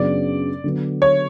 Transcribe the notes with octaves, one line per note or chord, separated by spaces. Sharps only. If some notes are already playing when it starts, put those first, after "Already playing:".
Already playing: F#2 C#3 F#3 B3 D4 D5
D3 F#3 B3
C#5